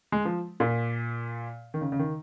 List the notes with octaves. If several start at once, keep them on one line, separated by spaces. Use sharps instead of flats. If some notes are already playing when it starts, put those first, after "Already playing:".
G#3
F3
A#2
D#3
C#3
C#3
D#3